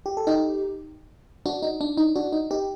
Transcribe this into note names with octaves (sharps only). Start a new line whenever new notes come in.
G4
A4
D#4 G4
D4 F#4
D#4
D4
D#4
D4 F#4
D#4
D#4 G4